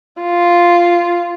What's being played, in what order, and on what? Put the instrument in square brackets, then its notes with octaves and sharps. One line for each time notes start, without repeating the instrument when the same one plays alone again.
[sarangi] F4